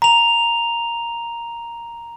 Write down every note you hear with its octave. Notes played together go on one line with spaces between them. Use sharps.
A#5 F7